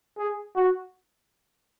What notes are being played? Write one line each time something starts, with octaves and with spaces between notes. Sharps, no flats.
G#4
F#4